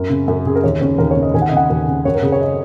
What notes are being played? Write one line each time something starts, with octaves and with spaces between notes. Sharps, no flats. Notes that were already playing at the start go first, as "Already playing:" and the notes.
Already playing: F#2 A#4
C#3
F#2
C#3 G#4
A#4
D#2 C#5
C#3 C#5
D#2 A#4
C#5
C#3
D#5
D#2 G#5
F#5
D#5
C#3 F#5
D#2
C#3
F#2 C#5
A#4
C#3 G#4
C#5
D#5